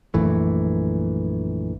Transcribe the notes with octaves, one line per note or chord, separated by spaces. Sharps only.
A#1 F#2 E3 A3